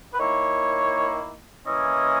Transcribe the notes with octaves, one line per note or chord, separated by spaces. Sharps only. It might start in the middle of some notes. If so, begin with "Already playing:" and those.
B4
D#3 A#3 E4 C#5
E3 A#3 C#4 E4 D#5